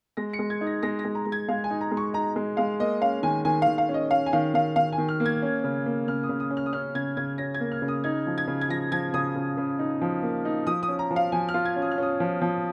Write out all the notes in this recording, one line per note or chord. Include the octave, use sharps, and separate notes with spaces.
G#3 A#6
C#7
G#3
G#6
D#4
A#6
G#3 A#6
A#6
G#3
A#5
G#3
G#6
G#3 F5
G#5
D#4
A#5
G#3
C#6
D#4 A#5
G#3
G#3 F5
A#3 D#5
C#4 F5
D#3 G#5
D#3 G#5
F5
D#3
F5
C#4
D#5
C#4 F5
G#5
D#3 F5
D#3 F5
D#3 F5
G#5
D#3
F6
A#3
G#6
C#4
C#3
A#3
C#3 F6
D#6
C#3
D#6
C#4
F6
D#6
C#4 F6
C#3 G#6
C#3 G#6
C#4 A#6
G#6
A#3
F6
C#3
D#6
D#4 G#6
F3
G#6
C#3
G#6
F3 A#6
F3 G#6
C#3 D#6
C#3
C#3
D#4
F3
A#3
D#4
F3 D#6
D#6
C#4
A#5
F3
F5
F3 G#5
F6
F4
G#6
C#4
D#6
F6
C#4 D#6
F3
F3